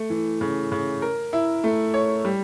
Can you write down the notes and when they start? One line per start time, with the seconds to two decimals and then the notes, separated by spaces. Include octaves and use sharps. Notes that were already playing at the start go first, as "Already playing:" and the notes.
Already playing: A3
0.10 E3
0.41 C#3
0.72 C#3
1.02 A#4
1.33 E4
1.64 A3
1.94 C#5
2.25 G3